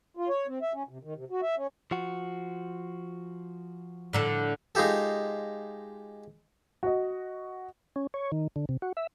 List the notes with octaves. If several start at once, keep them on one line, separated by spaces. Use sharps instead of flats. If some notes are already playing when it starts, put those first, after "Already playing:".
F4
C#5
C4
E5
C#4
C3
D#3
C3
F#4
E5
C#4
F3 F#4
A2 D3 A4
G#3 D#4 F4 G4 A4
F#4 D#5
C#4
C#5
D#3
D3
C3
F#4
E5